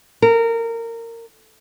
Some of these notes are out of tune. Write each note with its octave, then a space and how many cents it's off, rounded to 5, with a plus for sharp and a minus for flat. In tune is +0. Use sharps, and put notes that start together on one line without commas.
A#4 -20